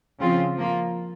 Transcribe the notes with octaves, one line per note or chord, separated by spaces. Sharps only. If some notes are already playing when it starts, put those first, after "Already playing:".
C#3 F3 C4 F4
F3 A#3 F4